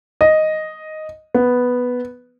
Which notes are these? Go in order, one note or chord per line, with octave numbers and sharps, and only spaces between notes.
D#5
B3